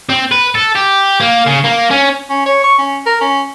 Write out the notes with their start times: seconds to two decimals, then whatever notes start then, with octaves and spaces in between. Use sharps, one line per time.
0.09 C4
0.31 B4
0.55 A4
0.75 G4
1.20 A#3
1.46 C#3
1.64 A#3
1.90 C#4
2.29 C#4
2.45 C#5
2.63 C#6
2.78 C#4
3.06 A#4
3.21 C#4